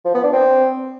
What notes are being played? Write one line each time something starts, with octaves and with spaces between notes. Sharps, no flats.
F3
B3
D4
C4